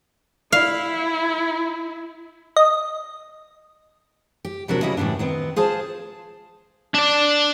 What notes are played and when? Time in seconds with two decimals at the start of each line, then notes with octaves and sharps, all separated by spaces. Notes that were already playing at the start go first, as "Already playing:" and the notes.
0.52 E4 F5
2.56 D#5
4.45 G4
4.68 E2 C3 F#3 C4 D4 A#4
4.82 C#3 F#3 G3 E4 D#5
4.97 A2 E3 G3 C4 D4
5.19 D#3 B3 C4
5.56 F4 G#4 C5 A5
6.94 D4 D5